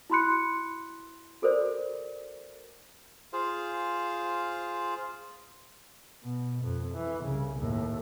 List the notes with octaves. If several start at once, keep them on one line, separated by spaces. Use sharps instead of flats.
E4 F#4 B5 C6 F#6 C#7
F#4 A4 A#4 C5 D5
F4 G#4 C5 F5
B2
F2
E3
C2 C#3
D#2 A2